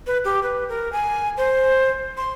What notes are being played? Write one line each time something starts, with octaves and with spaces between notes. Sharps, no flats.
B4
G4
B4
A#4
G#5
C5
C6